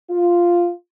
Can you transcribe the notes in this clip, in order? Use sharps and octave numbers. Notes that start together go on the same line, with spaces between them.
F4